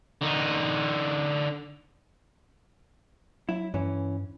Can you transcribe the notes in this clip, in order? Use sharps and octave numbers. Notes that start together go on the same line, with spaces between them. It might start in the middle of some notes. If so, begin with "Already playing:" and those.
D3 D#4
F#3 E4
G2 E3 C#4